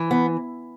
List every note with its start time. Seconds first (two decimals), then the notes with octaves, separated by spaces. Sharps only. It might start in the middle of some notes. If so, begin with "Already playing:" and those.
Already playing: E3
0.11 B3